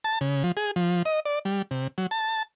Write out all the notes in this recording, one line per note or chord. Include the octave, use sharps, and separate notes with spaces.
A5
C#3
F3
G#4
F3
D#5
D5
G3
C3
F#3
A5